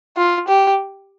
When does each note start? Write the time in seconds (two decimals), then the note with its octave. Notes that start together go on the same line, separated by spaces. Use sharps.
0.17 F4
0.48 G4